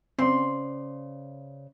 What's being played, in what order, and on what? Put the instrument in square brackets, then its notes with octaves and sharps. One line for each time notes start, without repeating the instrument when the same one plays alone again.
[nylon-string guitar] C#3 C5 D5 [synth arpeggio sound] C4 [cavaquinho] C6